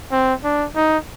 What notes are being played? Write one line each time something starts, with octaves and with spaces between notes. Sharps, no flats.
C4
D4
D#4